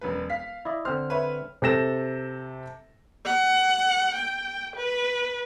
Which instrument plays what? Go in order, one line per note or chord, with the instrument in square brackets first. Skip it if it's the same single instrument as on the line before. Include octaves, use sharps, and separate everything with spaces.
[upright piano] E1 F#2 B4
F5 B6
[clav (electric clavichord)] E4 D5 D#5
[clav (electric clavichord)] D3 C4 C5 [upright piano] F6
[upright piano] B4 C#5 E5
C3 A4 A#6 E7
[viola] F#5
G5
B4